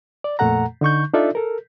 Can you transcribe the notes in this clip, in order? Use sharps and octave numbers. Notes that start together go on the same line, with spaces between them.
D5
F2 A#2 A3 A4 F#5 A#5
D3 D#4 C#6 G6
D4 D#4 F4 A4 D5 E5
A4 A#4